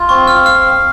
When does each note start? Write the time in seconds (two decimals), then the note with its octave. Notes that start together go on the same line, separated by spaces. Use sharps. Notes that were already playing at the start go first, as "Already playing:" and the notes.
Already playing: F4
0.09 C4 C#6
0.27 F6
0.45 F5 F6